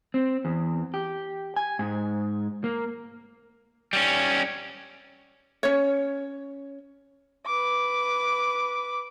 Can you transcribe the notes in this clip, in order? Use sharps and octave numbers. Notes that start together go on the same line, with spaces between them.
C4
E2
G4
G#5
G#2
A#3
G3 C#4
C#4 C#5
B4 D6